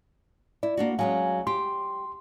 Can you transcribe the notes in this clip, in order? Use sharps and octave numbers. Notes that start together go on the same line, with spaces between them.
E4 D5
A#3 D4 F#4
F#3 G#3 C#4 F5 G#5
G4 C6